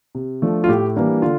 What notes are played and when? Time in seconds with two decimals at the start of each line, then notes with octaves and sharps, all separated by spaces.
0.15 C3
0.42 F3 A3 D4
0.64 F4
0.68 A2 G4
0.96 E3 G3 A#3 D4
1.22 D3 F4